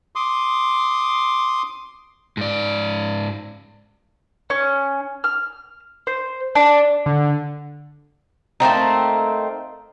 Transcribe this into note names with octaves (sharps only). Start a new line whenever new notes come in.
C6 D6 D#6
G#2 D5
C#4
F6
C5
D4
D3
A3 A#3 C4 D#4